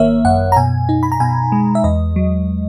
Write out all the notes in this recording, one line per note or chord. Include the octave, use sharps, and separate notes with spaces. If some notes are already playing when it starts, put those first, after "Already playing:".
Already playing: G#1 D#3 A#3 C#5 E5
F#2 F#5
A#5
B2 G#5
D#4
B5
A#5
B2 G#5
G#3
E5
E2 D#5
F#3